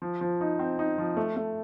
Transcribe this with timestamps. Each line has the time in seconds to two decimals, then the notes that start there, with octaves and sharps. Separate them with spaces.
0.02 F3
0.21 F3
0.41 D#4
0.59 C4
0.79 D#4
0.98 F3
1.17 A3
1.36 A3